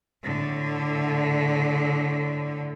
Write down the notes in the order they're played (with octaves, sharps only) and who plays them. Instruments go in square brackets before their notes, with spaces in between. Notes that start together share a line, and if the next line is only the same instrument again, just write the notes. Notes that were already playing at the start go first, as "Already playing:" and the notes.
[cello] A2 D3